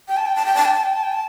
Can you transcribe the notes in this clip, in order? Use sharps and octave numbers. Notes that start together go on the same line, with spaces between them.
G5
A5
G5
A5
G5
A5
G5
A5
G5
A5
G5
A5